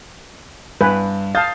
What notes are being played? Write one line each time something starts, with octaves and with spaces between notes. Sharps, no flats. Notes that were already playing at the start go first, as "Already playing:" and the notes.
G2 B4 G#5
F5 A5 D#6 G6 A6